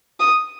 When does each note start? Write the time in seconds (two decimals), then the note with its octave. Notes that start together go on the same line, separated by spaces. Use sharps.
0.20 D#6